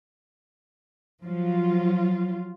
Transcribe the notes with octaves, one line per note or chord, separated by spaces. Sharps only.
F3 F#3 F4